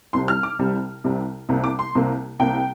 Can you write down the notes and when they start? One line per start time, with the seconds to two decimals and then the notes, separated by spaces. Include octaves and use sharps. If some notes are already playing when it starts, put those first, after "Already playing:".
0.13 C2 C3 G3 C6
0.28 F6
0.43 D6
0.59 C2 C3 G3
1.04 C2 C3 G3
1.49 C2 C3 A#3
1.64 D6
1.79 C6
1.95 C2 C3 A#3
2.39 C2 C3 A#3 G5